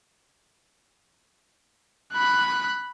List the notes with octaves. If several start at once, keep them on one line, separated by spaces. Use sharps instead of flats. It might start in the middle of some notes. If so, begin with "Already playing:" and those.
B5 F#6